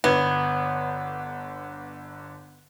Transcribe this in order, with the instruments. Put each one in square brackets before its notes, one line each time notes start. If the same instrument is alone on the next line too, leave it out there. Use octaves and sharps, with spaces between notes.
[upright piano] G1 D3 G#6 [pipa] B3